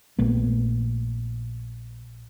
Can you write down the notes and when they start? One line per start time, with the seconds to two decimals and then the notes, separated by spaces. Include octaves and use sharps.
0.18 A#1 A3 B3